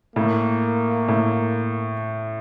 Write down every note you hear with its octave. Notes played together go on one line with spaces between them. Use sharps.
A2 A#3
A2